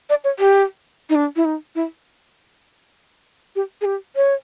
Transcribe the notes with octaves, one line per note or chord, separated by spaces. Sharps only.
D5
C#5
G4
D#4
D4
E4
D#4
E4
G4
G#4
G4
C#5